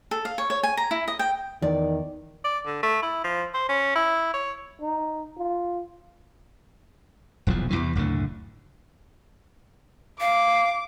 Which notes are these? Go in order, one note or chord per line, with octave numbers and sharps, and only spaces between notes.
A4
F5
C#5
C#5
G#5
A#5
E4
D#5
G5
E2 D#3 D5
D5
D3
A3
E4
F3
C5
C#4
E4
C#5
D#4
F4
D#1 B1 E2 F3
E2 G2 C3 E3
F#1 D2 A2 D3
F5 D6